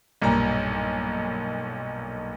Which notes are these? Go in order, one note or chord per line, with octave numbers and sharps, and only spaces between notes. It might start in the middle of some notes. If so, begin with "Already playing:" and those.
B1 G2 A#2 A#5